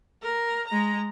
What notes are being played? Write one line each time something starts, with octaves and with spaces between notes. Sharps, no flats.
A#4
G#3 A#5